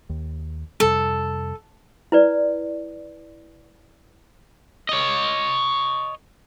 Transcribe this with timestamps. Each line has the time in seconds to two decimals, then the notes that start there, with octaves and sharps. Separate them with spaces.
0.09 D#2
0.80 F2 C3 G3 A4
2.12 E4 B4 D5
4.89 C#5 D#5